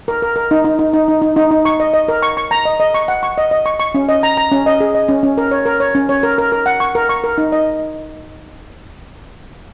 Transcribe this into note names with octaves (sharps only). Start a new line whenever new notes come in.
A#4
A#4
A#4
D#4
D#4
D#4
D#4
D#4
D#4
D#4
D#4
C#6
D#5
D#5
A#4
C#6
C#6
A#5
D#5
D#5
C#6
F#5
C#6
D#5
D#5
C#6
C#6
C#4
D#5
A#5
A#5
C#4
D#5
G#4
D#5
C#4
C#4
A#4
C#5
A#4
C#5
C#4
C#5
A#4
A#4
A#4
F#5
C#6
A#4
C#6
A#4
D#4
D#5